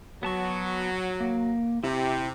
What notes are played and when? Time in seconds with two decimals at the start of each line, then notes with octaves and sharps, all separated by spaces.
0.23 F#3 B3 A5 C#6
1.20 A#3
1.84 C3 E4 G4